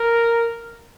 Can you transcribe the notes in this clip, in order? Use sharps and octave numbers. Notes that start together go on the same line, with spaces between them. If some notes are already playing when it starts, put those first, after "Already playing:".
Already playing: A#4